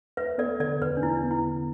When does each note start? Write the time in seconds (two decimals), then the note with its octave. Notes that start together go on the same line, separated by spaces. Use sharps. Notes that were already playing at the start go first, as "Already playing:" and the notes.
0.17 E2 B4 E5
0.38 B3 A4 D5
0.60 D3 A4 D5
0.82 E2 B4
0.97 D4
1.02 E2 E4
1.24 B3
1.31 E4
1.45 D3